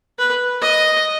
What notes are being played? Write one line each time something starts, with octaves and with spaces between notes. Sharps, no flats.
B4
D#5